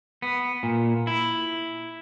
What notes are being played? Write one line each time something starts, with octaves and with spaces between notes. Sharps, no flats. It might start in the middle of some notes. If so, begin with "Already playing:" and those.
B3
A#2
E4